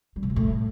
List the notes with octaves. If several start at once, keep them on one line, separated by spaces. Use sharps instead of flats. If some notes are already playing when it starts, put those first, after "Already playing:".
G3
B2
A#2
A2